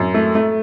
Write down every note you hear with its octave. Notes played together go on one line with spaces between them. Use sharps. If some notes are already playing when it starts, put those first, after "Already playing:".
Already playing: F#2
A3
A3